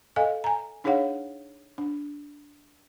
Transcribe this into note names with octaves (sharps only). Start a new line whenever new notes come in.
A4 D#5 F5 G#5
G#5 A#5
D4 D#4 G#4 C#5 F5 F#5
D4